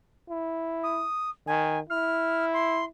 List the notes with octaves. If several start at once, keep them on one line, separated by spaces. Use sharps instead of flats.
E4
D#6
D#3 G#5
E4 F6
C6